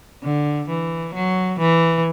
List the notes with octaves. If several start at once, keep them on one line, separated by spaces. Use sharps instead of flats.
D3
E3
F#3
E3